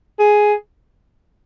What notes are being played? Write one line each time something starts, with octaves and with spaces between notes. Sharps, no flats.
G#4